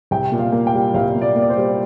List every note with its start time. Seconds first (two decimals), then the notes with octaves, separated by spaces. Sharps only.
0.11 C2 G5
0.32 A#2
0.39 F5
0.52 A#3
0.67 G5
0.74 G3
0.94 C2 F5
1.15 A#2
1.21 D5
1.36 A#3
1.42 D5
1.50 C5
1.57 G3